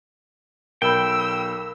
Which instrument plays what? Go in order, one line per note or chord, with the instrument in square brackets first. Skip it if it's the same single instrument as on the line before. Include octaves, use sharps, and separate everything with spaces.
[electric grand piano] B1 [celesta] A#4 B5 [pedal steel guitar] G5 [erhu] E6